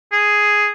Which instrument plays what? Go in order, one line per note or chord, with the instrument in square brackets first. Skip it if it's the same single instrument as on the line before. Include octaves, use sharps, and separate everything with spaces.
[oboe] G#4